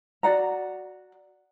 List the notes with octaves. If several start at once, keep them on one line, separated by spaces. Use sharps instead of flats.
F#4 D5 F#5 A#5